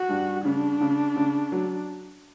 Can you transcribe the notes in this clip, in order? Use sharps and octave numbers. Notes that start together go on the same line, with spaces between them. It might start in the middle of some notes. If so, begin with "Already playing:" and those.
Already playing: F#4
G2
C#3 D4
C#3
C#3
F#3